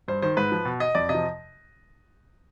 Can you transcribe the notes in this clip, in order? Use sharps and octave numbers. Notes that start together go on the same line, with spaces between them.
G2 C5
D#3 C5
G#2 B4
F3
B2
D#5
F2 D5
C3 D#5
F3